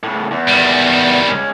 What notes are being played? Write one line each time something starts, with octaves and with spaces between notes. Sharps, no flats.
A2 C#3
E2
D#3 G3
G#3 C#4